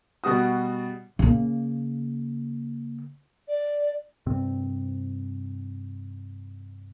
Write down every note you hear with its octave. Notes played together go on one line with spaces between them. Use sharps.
B2 G3 F#4 D#6
C#3 A#3
D5
G2 C3 C4